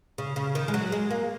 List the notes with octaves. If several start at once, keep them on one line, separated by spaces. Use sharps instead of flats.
C#3
C#3
D#3
G#3
F#3
G#3
A#3